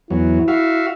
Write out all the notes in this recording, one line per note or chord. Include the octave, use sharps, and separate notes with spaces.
E2 F#3 E4
F#4 E5 F5